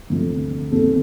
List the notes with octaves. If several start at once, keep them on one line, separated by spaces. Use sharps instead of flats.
D2 C3 F3 A3
F2 C3 D#3 G3 A4